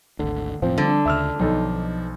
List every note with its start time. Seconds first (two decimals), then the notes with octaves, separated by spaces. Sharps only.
0.19 G#1 D2 D3
0.62 E1 A2 E3 F3 C4
0.78 D3 G3
1.06 D2 C#3 E5 E6 F6
1.40 B1 F3 D#4 A4